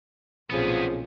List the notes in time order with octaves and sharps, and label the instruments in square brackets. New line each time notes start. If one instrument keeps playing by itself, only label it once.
[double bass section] B1 A#2 [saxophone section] F2 C#3 F3 [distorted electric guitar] B3 G#4